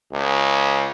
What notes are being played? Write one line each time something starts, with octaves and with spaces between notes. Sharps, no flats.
C#2